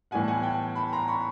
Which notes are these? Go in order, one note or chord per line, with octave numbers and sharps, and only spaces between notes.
A2 E3 G3 B3 F#5 G#5
A5
F#5 G#5
G5 A5
A5 B5
A#5 C6
B5 C#6